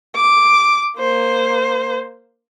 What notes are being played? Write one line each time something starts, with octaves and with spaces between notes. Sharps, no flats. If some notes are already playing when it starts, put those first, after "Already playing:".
D6
A#3 C5